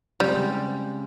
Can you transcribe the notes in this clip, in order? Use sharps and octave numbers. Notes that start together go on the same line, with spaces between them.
C#3 G3 G#3 C4 G4